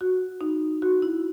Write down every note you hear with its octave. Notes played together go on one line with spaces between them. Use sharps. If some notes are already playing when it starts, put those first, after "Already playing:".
F#4
D#4
F#4
E4